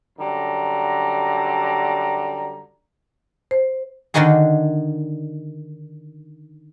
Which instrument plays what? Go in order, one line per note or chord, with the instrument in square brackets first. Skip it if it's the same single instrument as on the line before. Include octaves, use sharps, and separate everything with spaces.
[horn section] F#2 D3 G3 A#5
[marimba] C5
[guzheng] D3 D#3 D4 D#4 F#4 G#4